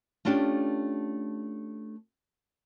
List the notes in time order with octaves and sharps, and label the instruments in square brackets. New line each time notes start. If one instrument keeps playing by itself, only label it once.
[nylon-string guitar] A3 C#4 D4 F4 G4